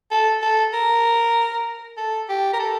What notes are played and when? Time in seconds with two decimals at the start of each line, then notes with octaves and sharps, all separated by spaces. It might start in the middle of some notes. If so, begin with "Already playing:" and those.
0.11 A4
0.42 A4
0.73 A#4
1.97 A4
2.29 G4
2.53 A#4
2.59 A4